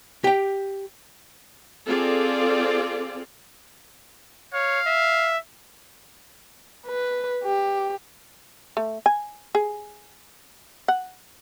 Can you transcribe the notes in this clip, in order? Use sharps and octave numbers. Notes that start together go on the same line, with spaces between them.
G4 G5
C4 F4 G#4 A4 D5
C#5 F5
E5
B4
G4
A3
G#5
G#4
F#5